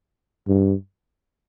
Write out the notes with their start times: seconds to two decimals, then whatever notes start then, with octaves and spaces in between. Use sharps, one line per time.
0.48 G2